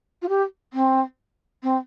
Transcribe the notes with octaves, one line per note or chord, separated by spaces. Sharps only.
F4
G4
C4
C4